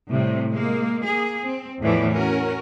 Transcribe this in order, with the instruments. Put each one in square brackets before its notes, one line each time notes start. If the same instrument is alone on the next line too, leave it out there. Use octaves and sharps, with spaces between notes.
[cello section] A2 C3 G3
G#3 A#3
A#3 G#4
C4
E2 A2 E3 F3 A3 D5
C#4 F#4 A#4